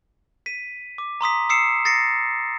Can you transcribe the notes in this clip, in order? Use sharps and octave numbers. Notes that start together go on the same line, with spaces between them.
B6 D#7
D6
A#5 C6 D#6 B6
D#6 E6 C7 C#7 E7
D#6 A6 A#6 C7 C#7